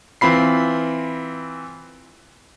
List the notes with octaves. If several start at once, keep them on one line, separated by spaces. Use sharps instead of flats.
E3 C4 F4 B5 C7